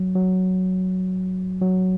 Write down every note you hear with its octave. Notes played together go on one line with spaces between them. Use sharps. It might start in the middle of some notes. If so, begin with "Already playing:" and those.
Already playing: F#3
F#3
F#3